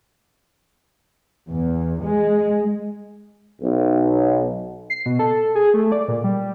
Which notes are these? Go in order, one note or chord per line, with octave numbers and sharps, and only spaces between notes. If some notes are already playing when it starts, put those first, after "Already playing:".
E2
G#3
B1
C7
B2
A4
G#4
A3
D5
A#2
G3